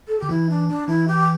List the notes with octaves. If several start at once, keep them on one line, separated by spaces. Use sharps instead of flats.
A4
D3 G4
E3 E4
D4
D4
E3 E4
G4